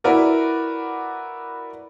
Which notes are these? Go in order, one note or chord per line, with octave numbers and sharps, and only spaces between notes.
E4 F#4 A#4 B4 D5